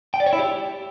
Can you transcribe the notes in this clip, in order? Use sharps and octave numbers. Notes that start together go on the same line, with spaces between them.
G5
D5
C#5
E4
G4